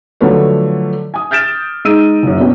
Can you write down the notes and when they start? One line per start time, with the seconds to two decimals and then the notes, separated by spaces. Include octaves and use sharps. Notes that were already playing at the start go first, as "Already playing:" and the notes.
0.21 D3 F3 F#3 A3 B4 C#5
1.14 G#5 D#6
1.31 F6 G6 A6 D7 E7
1.85 G#3 D#4 E6 D7 D#7
2.23 F#1 F#2
2.40 B2 B3 C#4 D4 E4 G4